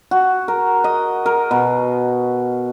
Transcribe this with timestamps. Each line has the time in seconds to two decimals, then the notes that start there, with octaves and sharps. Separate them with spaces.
0.11 F#4
0.48 A#4
0.84 D#5
1.26 A#4
1.51 B2